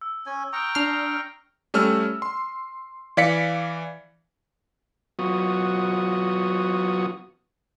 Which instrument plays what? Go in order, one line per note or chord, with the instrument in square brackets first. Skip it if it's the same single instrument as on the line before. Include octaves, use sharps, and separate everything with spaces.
[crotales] E6
[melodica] C#4 G#5
[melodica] G5 A#5 C#6 [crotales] D#6 F6 D7
[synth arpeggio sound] D4 F6 [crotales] C7
[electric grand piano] G3 A3 C#4 E6 F6
C6
E3 D5 F5 B6 C#7
[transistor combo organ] F#3 B3 F4 F#4 C#6 D#6